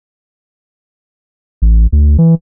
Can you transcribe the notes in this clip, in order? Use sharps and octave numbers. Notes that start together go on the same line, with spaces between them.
A1
D2
E3